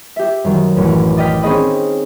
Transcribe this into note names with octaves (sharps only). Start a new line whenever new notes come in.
G4 E5
F#2 D#3 F#3
A1 F#2
D5 D#5 G5 F6 B6
C4 C#4 D#4 G#4 D#5 B5